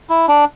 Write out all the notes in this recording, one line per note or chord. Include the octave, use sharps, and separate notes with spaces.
E4
D4